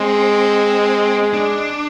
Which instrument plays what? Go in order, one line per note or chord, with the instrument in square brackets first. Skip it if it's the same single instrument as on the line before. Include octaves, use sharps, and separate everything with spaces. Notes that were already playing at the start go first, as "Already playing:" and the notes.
Already playing: [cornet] G#3 [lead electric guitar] C4
[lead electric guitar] D4